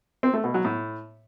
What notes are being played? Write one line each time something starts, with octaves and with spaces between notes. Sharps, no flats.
C4
A3
B2
F#3
A2